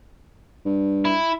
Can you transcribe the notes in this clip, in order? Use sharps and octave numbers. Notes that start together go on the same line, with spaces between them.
G2
E4